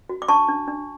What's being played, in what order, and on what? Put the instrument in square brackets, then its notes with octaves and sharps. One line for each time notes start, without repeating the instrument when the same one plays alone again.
[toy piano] F#4
D6
D4 A5 C#6
D4
D4